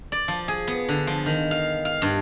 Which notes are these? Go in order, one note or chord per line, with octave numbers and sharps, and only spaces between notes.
D5
F3
G#4
B3
D3
F3
D#3
F5
F5
G2